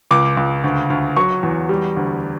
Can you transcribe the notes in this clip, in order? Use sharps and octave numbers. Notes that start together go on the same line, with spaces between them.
C#2 D6
C#2
D2
D2
F#3 C#6
E2
G3
D2